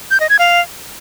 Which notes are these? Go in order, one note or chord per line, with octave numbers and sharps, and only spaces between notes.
G6
D#5
G#6
F5